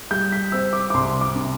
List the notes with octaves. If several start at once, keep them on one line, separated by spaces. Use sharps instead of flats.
G3 G6
B6
C4 E6
D6
D6
C2 C6
D6
C3